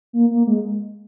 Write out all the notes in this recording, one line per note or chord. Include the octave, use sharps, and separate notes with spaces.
A#3
A#3
G#3